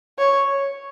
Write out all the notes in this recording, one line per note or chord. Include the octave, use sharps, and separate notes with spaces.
C#5